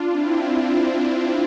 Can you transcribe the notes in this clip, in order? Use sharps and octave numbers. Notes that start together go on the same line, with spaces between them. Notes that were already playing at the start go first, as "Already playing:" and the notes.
Already playing: D4 F4
C4 E4
C4 E4